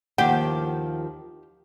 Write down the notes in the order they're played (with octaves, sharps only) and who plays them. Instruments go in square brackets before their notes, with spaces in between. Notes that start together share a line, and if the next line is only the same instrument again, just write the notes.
[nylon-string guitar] D#2 D#3 F3 [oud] G4 [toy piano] F#5